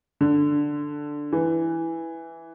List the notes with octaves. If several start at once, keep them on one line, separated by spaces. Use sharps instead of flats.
D3
E3